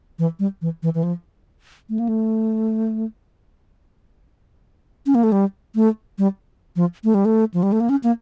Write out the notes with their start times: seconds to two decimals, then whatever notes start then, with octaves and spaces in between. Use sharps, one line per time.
0.19 E3
0.39 G3
0.62 E3
0.83 E3
0.95 E3
1.03 F3
1.89 A3
1.99 A#3
2.09 A3
5.06 C#4
5.15 A#3
5.24 A3
5.32 G3
5.75 A3
6.18 G3
6.76 F3
7.04 A3
7.14 G3
7.25 A3
7.54 F3
7.63 G3
7.72 A3
7.80 A#3
7.89 C#4
8.04 A#3